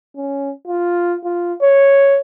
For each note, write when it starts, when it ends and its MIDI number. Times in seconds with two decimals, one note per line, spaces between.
0.17 0.52 61
0.67 1.16 65
1.25 1.54 65
1.62 2.19 73